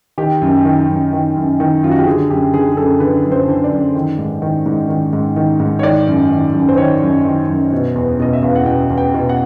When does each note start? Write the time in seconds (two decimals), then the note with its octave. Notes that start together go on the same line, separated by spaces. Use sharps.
0.18 D#3 G4
0.42 F#2
0.65 D#3
0.88 F#2
1.13 D#3
1.36 F#2
1.60 D#3
1.83 F#2 F4
1.91 F#4
1.99 G4
2.06 D3 G#4
2.30 F#2 G4
2.54 D3 G#4
2.72 G#4
2.77 F#2 A4
3.00 D3 B4
3.24 F#2
3.32 C5
3.48 D3
3.64 D5
3.71 F#2
3.95 D#3
4.18 G#2
4.42 D#3
4.66 G#2
4.89 D#3
5.13 G#2
5.36 D#3
5.60 G#2
5.79 C#5
5.83 D#3 D5
6.08 F#2
6.31 D#3
6.54 F#2
6.69 C5
6.77 D#3 C#5
7.02 F#2
7.25 D#3
7.49 F#2
7.73 B2
7.95 E2
8.20 B2 D#5
8.33 E5
8.42 E2 F5
8.55 F#5
8.66 B2 G5
8.90 E2
8.98 G5
9.14 B2
9.29 F#5